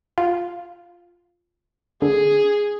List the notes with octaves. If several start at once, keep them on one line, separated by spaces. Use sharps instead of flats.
F4
D3 G#4